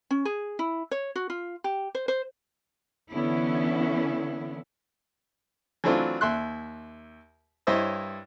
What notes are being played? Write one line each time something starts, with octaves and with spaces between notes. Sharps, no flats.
C#4
G#4
E4
C#5
F#4
F4
G4
C5
C5
D3 E3 B3 C#4 E4
E3 F#3 A3 C4 D4 F4
D#2 E5 C6 F#6
G2 E4 C5 C#5 D#5 E6